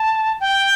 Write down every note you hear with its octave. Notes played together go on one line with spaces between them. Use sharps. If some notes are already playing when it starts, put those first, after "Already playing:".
Already playing: A5
G5